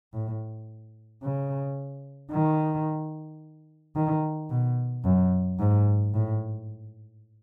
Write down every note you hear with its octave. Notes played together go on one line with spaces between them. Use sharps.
A2
C#3
D#3
D#3
B2
F#2
G#2
A2